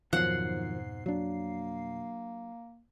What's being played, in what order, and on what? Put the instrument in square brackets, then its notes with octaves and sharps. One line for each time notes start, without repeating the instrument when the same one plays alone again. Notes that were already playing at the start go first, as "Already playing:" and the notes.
[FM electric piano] F2 B2 C7 [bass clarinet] G#2 [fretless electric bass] D#3 F3 F#3 [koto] F#5
[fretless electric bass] F#3 D4 [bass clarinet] A#3